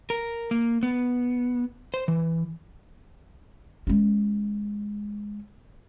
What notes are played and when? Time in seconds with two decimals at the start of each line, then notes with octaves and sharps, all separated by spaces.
0.10 A#4
0.51 A#3
0.83 B3
1.94 C5
2.08 E3
3.87 G#3 C#4